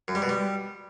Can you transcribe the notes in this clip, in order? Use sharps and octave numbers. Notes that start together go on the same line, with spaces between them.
F#2
G3
B2
G3